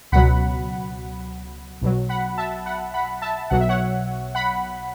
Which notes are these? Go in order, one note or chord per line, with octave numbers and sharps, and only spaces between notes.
C#2 B2 F#3 F#5 B5
B1 B2 F#3
F#5 B5
E5 A5
F#5 B5
F#5 B5
E5 A5
B1 B2 F#3 F#5
E5
C#5 F#5
F#5 B5